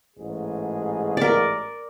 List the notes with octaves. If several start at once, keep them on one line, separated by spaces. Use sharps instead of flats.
A1 G#2 G#4
A#4 D5